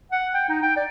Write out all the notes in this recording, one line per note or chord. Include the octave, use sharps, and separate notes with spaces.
F#5
G5
D#4
G5
D5